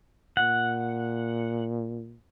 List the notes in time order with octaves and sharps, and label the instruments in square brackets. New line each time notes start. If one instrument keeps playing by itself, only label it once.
[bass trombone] A#2 [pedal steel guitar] F#5